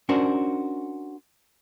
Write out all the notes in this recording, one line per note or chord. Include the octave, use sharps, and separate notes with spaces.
C#4 D4 F#4 A#4 C5